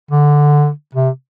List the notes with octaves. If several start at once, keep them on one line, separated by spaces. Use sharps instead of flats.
D3
C3